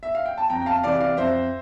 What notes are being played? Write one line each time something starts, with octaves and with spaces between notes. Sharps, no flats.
E5
F5
G5
A5
F2 G5 A#5
G5
F5 A5
C3 E3 D5 F5
D5 F5
F2 C5 E5